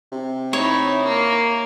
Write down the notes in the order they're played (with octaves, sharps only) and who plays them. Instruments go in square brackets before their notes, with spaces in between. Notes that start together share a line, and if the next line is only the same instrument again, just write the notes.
[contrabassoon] C3
[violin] D#4 E4 [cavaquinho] C#5
[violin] A#3